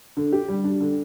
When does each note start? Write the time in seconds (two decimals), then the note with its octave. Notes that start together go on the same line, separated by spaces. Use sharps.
0.17 D3
0.33 G4
0.49 G3
0.64 D4
0.80 D3